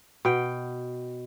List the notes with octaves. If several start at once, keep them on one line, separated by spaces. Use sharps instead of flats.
B2 G5